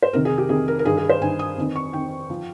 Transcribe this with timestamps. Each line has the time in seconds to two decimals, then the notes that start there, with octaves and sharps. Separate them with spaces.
0.02 C5
0.13 F2 C3 D#3 A#4
0.25 G#4
0.38 G4
0.49 F2 C3 D#3 G#4
0.68 A#4
0.79 A#4
0.85 G2 D#3 G#4
0.98 G#4
1.09 C5
1.22 G2 D#3 G#5
1.39 D#6
1.57 F2 D#3
1.76 C#6
1.93 F2 D#3 G5
2.30 F3